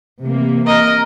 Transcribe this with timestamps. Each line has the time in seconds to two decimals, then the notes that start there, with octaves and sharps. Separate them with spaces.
0.21 C3 E3 A#3
0.66 A#4 D#5